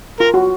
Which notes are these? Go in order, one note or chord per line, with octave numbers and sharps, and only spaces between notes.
F4 A#4
F#4